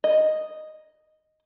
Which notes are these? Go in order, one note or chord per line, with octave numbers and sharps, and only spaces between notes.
D#5